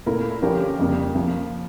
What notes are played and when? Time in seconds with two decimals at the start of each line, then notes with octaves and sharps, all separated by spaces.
0.06 A#2 A3 E4 A#4
0.42 D3 F3 C#4 G4 A#4
0.79 F2 C#3 G3 A#3 D4
1.15 F3 A#3